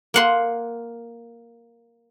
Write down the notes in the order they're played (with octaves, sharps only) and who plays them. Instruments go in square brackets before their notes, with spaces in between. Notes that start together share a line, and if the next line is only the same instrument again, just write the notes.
[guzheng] A#3 F#5 C6